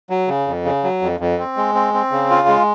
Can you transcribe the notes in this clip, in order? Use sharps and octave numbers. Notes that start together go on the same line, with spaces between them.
F#3
C#3
F2
C#3
F#3
F2
F2
C4
G#3
C4
C4
C#3
F4
G#3